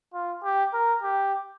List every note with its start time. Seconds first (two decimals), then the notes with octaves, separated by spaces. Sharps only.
0.14 F4
0.43 G4
0.73 A#4
1.02 G4